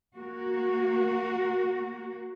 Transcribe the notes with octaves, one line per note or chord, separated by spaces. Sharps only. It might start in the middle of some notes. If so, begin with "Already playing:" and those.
A#3 F#4